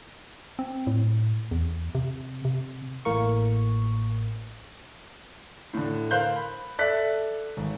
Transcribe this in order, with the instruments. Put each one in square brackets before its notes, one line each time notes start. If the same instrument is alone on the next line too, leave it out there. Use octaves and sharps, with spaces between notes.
[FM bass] C4
A2
E2
C3
C3
[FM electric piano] A1 A2 A#3 A#4 C#6
[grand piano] A2 D3
A#4 C5 F5 F#6 G6
B5
A4 D5 E5 F#6 B6
G#1